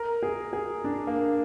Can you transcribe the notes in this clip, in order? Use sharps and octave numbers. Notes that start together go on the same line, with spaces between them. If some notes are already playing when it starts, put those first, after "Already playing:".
Already playing: A#4
G#4
G#4
D4
A#3